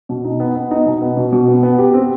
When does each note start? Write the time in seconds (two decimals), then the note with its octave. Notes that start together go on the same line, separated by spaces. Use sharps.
0.09 B2
0.25 D#4
0.40 B3
0.55 B3
0.71 D#4
0.86 B2
1.02 B3
1.17 B2
1.32 B2
1.48 B3
1.63 B3
1.78 G4
1.94 C4